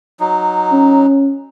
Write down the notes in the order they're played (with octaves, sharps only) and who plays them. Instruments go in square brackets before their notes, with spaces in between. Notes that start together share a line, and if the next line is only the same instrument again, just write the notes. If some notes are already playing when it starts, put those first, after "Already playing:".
[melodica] F#3 D#4
[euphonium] C#4